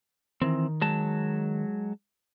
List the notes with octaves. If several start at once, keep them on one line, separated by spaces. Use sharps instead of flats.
D#3 E3 C4
F#3 G#3 A5